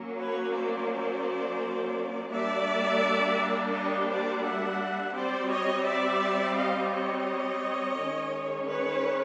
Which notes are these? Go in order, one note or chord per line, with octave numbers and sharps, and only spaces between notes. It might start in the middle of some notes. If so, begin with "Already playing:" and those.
Already playing: F#3 A#3 C#4
B4 C#5
C5 D5
G3 A#3 D4 D5 E5
C#5 D#5
C5 D5
E5 F#5
G3 C4 C5 D5
C#5 D#5
D5 E5
D#5 F5
C#5 D#5
D#3 G#3 C#4
B4 C#5